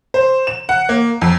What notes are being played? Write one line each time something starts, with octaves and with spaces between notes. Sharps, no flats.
C5
E7
F#5
A#3
F2